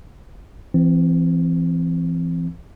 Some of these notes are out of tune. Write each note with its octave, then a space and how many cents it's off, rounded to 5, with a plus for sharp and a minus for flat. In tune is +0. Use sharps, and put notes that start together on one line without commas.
E3 +30 C4 -10